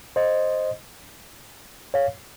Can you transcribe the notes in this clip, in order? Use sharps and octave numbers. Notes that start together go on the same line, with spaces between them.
C5 D#5
C#5 F5